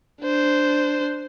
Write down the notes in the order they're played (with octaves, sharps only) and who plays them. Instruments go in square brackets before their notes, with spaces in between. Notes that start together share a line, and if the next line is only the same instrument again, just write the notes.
[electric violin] D4 C5